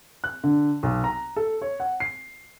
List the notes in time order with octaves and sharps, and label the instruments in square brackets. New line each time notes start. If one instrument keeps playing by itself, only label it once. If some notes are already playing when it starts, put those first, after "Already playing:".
[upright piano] F#6
D3
B1
A#5
A4
C#5
F#5
C7